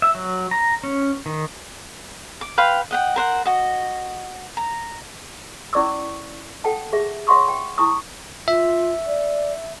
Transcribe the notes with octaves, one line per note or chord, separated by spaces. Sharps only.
E5
F#3
A#5
C#4
D#3
D6
B4 F5 G5 C6
D#5 F#5 G5
A#4 C5 F#5
F#4 D#5
A#5
C#4 E4 D5 C#6 D6 E6
A4 F#5 G5 A5
G4 G#4 E5
C#5 E5 F#5 C6 C#6 D#6
G5
E4 G#5 A#5 C#6 D#6 E6
F4 E5
D5